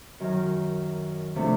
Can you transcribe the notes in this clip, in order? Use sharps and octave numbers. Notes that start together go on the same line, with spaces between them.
F#2 D#3 F#3
C3 F3 A3 D4